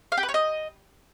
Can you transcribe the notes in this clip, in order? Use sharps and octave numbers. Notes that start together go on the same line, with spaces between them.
F5
G4
B4
C#5
D#5